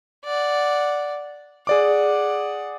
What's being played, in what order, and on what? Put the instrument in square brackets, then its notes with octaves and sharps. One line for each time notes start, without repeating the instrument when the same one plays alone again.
[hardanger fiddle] D5 F#5
[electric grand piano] G#4 D5 D6 [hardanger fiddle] F#5